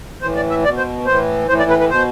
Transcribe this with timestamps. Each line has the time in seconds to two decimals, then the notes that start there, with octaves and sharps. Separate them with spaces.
0.22 A2 E3 C5
0.36 D5
0.50 E5
0.64 B2 D5
0.78 C5
1.06 A2 E3 C5
1.48 A2 E3 C5
1.59 D5
1.70 B4
1.80 B4
1.90 B2 C5